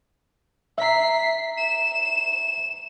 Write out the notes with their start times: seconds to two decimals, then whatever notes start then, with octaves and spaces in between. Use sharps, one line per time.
0.78 E5 A#5 B6 C7
1.58 E7